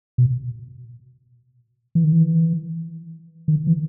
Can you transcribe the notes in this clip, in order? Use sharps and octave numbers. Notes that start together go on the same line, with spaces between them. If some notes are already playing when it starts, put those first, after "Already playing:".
B2
E3
D#3
E3
D#3
E3